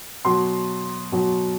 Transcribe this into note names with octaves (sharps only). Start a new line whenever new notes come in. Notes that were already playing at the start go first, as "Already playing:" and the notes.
B2 F#3 C6
B2 F#3